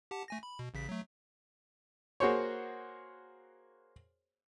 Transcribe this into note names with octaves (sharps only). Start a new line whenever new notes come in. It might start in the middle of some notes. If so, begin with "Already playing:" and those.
G4 F#5 A5
A3 G#5 A#6
B5
B2
A1 C#3 B6
F#3 A3
A#3 F#4 G#4 C5 C#5